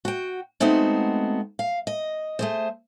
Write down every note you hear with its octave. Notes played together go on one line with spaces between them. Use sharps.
F#4 G5
G#3 A3 B3 C4 D#4 F#4
F5
D#5
A3 G#4 C5